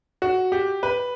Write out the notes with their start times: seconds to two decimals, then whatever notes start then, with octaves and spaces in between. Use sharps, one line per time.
0.22 F#4
0.52 G4
0.83 B4